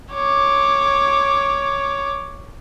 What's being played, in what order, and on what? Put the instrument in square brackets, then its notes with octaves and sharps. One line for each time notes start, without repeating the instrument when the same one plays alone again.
[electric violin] C#5 D6